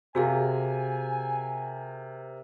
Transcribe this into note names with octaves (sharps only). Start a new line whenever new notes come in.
C3 F#4 G#4 A#4 F5 G#5